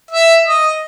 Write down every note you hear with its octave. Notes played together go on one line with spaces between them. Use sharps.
E5
D#5